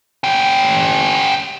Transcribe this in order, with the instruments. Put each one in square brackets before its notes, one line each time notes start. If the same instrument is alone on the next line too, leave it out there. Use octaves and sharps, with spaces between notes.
[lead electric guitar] C#4 G4